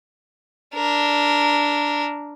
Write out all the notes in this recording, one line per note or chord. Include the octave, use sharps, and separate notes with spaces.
D4 A#4